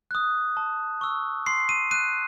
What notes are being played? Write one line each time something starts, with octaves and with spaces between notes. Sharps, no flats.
D#6 F#6
A5
C#6 E6
C6 C7
D#7
F#6 D#7